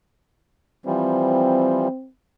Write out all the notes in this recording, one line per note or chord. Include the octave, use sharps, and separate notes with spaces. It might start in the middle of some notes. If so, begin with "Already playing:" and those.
E3 F3 G3 C4